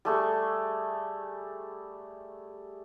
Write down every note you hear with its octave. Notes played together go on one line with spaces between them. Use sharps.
G3 A3 G#4 C#6